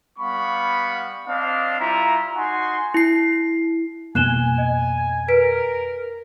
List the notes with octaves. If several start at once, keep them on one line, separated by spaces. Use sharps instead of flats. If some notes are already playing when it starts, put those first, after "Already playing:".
G3 B3 F5 B5 C#6
C4 D4 D#5 F5
G3 E4 F4 A#5
D#4 F#4 G#5 C6
E4 C7
F2 B2 A#3 G#5 F#6 E7 G7
D#5
A#4 B4 B6 D7